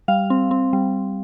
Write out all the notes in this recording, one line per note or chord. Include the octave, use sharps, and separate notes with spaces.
G3 F5
C4
C4
G3